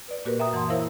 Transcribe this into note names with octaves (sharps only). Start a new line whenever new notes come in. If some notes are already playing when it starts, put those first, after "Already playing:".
B4 D5
A#2 A#3 F#4 G4 A#4 B4
E5 G5 A#5 D#6
F#2 E3 F#5 A5 C6 D#6
E4 A#4 C5 C#5 E5 F5